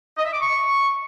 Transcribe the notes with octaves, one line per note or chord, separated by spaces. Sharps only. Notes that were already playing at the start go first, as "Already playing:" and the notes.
D#5
E5
D6
C#6